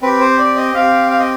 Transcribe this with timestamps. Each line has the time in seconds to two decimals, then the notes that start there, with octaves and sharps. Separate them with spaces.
0.02 C4 G4 B4
0.21 C5
0.39 D5
0.57 D#5
0.74 C4 G4 F5
1.11 F5
1.19 D#5